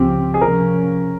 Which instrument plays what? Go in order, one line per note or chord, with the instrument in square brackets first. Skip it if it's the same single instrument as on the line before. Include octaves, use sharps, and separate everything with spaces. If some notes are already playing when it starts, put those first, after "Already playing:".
Already playing: [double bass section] C#2 C#3 F3 C4 [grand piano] G4
[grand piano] G#4
[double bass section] C3 F3 A#3 C#4 [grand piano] A#4